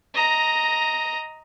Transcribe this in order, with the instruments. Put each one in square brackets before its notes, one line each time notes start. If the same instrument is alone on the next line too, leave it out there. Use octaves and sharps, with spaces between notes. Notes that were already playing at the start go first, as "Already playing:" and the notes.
[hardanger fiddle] D#5 A#5